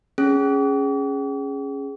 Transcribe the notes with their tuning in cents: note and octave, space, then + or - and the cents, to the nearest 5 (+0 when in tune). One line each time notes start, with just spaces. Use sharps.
C#4 +0 G#4 +0